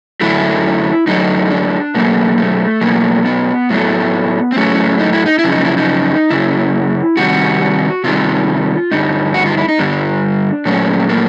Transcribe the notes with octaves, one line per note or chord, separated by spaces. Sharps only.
F#2 D3 F#3 A3 E4
F#2 D3 F#3 A3 D#4
D4
B2 F#3 A3 A#3
A3
B2 F#3 A3 A#3
B3
A2 F#3 A3
C4
A2 F#3 A3 C#4
D#4
E4
D#4
E4
F#2 C#3 F3
D#4
E4
D#4
F#2 C#3 E4
C3 D#3 G3 F#4
C3 D#3 G3 F4
G2 D3 G3 D#4
F#4
F4
E4
D#4
G2 D3 G3 D4
A#2 F#3 A3 C#4
A#3